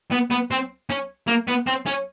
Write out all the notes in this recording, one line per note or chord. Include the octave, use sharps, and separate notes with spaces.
B3
B3
C4
C#4
A#3
B3
C4
C#4